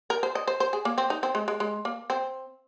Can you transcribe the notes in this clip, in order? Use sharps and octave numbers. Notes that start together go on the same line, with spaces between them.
A#4
C5
D#5
C5
C5
G#4
A#3
C4
D#4
C4
G#3
G#3
G#3
A#3
C4